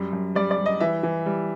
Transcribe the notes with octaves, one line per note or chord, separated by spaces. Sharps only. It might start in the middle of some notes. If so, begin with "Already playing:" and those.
Already playing: F#2 G3
F#2
G3 D5
D5
G3
D#5
E3 E5
E3
G3